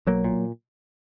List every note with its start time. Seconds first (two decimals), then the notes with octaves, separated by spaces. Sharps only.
0.07 B1 F#3 A#3
0.24 A#2